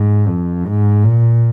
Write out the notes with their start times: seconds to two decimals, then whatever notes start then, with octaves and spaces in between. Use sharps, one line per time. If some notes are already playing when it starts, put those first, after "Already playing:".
Already playing: G#2
0.28 F2
0.66 G#2
1.04 A#2